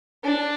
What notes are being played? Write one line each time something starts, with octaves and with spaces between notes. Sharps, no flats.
D4